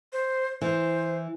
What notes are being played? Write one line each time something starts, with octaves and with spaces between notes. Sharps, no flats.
C5
E3 C5